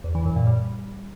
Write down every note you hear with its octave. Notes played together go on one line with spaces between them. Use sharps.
E2
E3
F#2
A#2
G3